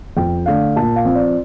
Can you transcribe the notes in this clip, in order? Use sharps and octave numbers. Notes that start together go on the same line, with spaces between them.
F2 G5
D3 A3 D4 F5
A#2 A5
F5
F3 C4
D5